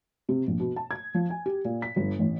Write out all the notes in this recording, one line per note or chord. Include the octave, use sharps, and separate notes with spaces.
C3
A#1
B2
A5
G#6
F3
G#5
G4
A#2
B6
G1
A1